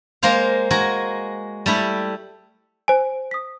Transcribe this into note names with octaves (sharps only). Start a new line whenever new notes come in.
G#3 A#3 A#4 C5 F5
G#3 F#4 G#4 A#4
G3 A3 E4
C5 G#5
D#6 B6